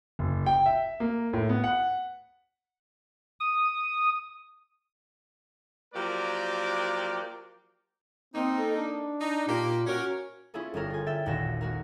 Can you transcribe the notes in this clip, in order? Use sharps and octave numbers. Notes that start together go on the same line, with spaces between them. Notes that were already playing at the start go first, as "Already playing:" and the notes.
F#1
G5
E5
A#3
A2
B3
F#5
D#6
F3 F#3 A#3 G4 A#4 D5
A#3 C4 D#4
A4
D4
D#4
A#2 A#3 G4
C#4 F#4 A#4
C#4 E4 F4 G#4 A4
G1 D3 C#4 A4 A#4
F4 G#5
E5 G5 A6
G#1 D#2 A#2 F#4 A#6 E7
G#3 F#4 A#4